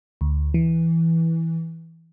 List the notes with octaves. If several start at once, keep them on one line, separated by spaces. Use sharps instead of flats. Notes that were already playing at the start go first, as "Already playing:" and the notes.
D2
E3